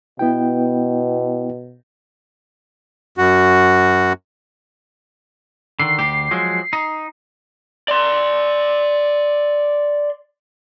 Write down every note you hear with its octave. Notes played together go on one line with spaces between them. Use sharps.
B2 B3 E4 G5
F#2 F#4
D3 D#3 C7
D2 G4
F3 F#3 G#3
D#4
D5 C6